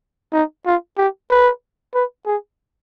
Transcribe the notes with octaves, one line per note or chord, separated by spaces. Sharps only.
D#4
F4
G4
B4
B4
G#4